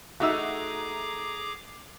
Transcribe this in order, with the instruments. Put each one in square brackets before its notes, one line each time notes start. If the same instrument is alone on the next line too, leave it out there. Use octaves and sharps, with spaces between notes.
[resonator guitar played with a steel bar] A3 D#4 [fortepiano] F#4 E6 [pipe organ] G#4 A#5 D6 [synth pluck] E5